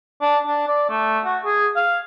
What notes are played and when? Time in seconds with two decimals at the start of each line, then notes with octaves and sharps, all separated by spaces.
0.21 D4
0.47 D4
0.68 D5
0.89 A3
1.25 F#4
1.45 G#4
1.76 F5